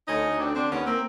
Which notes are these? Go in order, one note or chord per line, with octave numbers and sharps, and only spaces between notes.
D2 C#4 D#4
D2
D3 C4 D4
D3 C4 D4
D#2 B3 C#4
A#3 C4